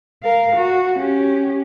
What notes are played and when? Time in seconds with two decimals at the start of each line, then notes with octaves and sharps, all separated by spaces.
0.23 A#4 F5
0.56 F#4
0.97 C#4 G4